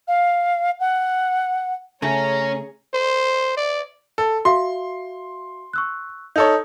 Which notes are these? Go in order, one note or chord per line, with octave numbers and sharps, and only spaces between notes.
F5
F#5
C#3 A3 C#4 G#4 C#5 A#5
C5
D5
A4
F#4 E5 F5 C6
C#6 E6 F#6
D#4 A4 C#5 G6